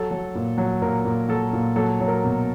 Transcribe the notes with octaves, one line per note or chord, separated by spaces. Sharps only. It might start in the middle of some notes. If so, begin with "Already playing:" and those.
Already playing: F#3 A4
F#3
A#2
F#3
A#2 A#4
A#2
F#3 A4
A#2
F#3 A4
F#3
A#4
B2